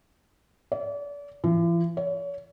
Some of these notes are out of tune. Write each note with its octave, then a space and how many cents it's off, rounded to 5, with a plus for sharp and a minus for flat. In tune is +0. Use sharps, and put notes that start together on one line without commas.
D5 -35
E3 +45
C#5 +35